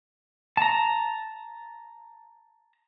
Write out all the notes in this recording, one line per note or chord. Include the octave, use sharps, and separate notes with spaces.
A5 A#5